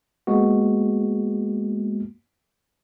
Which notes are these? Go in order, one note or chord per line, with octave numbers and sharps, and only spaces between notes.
G#3 A#3 B3 F#4